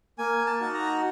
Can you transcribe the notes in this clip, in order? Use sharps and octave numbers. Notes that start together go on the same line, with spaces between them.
A#3 G#5
A5
D#4 F#4
A#5